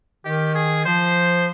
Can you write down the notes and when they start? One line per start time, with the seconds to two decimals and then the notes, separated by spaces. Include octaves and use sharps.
0.25 D#3 G4
0.55 G#4
0.86 F3 C5